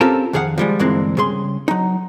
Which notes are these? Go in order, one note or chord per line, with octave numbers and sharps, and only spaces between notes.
C4 C#4 F4 G4 A4 A#4
F2 D#3 G#4 F5 F#5
F3 G3 G#3
D2 G2 E3 G#3 A#3 C4
C#3 G3 G#4 C6
F#3 D#4